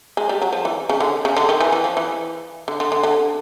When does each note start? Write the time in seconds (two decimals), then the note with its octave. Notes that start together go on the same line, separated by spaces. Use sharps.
0.17 G#3
0.29 G3
0.42 F#3
0.53 F3
0.65 E3
0.89 C#3
1.00 D3
1.25 C#3
1.37 D3
1.49 D#3
1.61 E3
1.72 E3
1.84 F3
1.97 E3
2.68 D3
2.80 D3
2.92 D3
3.03 D3